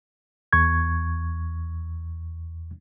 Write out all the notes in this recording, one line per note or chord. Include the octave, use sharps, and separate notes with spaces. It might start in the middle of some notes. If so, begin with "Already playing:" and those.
E2 C#6 G#6